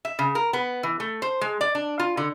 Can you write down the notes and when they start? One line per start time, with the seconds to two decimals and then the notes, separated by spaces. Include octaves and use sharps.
0.05 E5
0.19 C#3
0.35 A#4
0.53 B3
0.83 E3
1.00 A3
1.22 C5
1.41 G#3
1.61 D5
1.75 D4
1.99 F4
2.17 D3